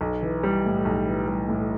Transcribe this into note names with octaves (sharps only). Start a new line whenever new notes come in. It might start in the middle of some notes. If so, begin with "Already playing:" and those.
B1
E3
G3
A2
B1
E3
G3
A2